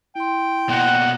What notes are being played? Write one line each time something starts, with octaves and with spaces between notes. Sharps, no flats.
E4 G5 C6
B2 A#3 F#5